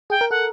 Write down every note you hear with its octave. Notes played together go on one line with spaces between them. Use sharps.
G#4 G5
A#4
A4 F#5